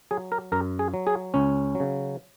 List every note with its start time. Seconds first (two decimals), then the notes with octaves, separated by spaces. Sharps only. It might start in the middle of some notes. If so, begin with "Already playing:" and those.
0.11 F#3 G#4
0.32 A#4
0.52 F#2 A#4
0.79 G#4
0.94 F#3
1.07 G#4
1.34 C#2 C#4
1.75 F#3
1.80 C#3